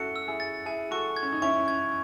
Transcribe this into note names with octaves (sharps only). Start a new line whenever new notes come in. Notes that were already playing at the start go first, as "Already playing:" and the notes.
Already playing: C#4 E4 F#4 A4 C#7
E6
E4 G#4
A6
E4 G#4 G#5
F#4 A4 C#6
G#6
C#4
D#4
C#4 E4 C#6
G#6